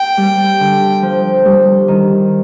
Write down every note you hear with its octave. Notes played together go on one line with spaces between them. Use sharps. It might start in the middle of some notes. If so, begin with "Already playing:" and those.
Already playing: G5
G3
D3
F3
G3
D#3